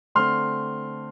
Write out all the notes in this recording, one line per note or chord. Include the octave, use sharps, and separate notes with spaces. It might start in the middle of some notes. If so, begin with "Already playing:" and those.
D3 A3 C4 C6 F6